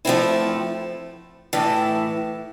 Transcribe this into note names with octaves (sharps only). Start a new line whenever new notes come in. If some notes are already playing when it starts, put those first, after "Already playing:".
F3 A3 C4 E4
A2 E3 A3 E4